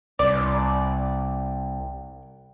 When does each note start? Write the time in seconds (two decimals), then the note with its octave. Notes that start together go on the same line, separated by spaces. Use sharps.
0.19 C2 D5